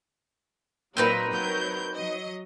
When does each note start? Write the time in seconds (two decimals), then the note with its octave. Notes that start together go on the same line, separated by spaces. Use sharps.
0.97 A#2 F#3 C4 D#4 A#4 B4
1.32 F#3 A#4 G6
1.94 F#3 D#5